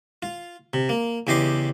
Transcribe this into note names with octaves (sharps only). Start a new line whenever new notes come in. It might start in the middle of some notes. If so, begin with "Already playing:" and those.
F4
C3
A#3
E2 C#3 G4 D#5 C6 D6